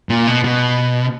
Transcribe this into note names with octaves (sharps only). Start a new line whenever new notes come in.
A#2
B2
B2